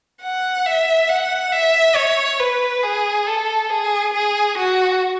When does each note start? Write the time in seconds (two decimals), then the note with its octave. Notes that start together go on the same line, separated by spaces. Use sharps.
0.22 F#5
0.66 E5
1.08 F#5
1.52 E5
1.95 C#5
2.39 B4
2.82 G#4
3.27 A4
3.69 G#4
4.14 G#4
4.58 F#4